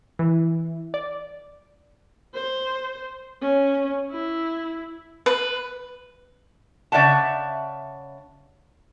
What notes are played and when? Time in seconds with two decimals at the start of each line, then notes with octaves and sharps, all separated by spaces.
0.19 E3
0.94 D5
2.34 C5
3.41 C#4
4.11 E4
5.26 B4
6.92 C#3 D5 E5 F#5 A5